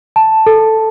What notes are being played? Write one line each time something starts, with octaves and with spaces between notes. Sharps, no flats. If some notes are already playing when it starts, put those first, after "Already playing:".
A5
A4